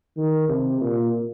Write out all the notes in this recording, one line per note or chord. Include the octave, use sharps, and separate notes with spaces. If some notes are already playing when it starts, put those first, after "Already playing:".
D#3
C3
A#2